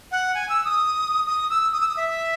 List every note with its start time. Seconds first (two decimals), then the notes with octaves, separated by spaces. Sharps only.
0.11 F#5
0.35 G#5
0.49 E6
0.65 D#6
1.27 D#6
1.50 E6
1.73 D#6
1.81 E6
1.88 D#6
1.97 E5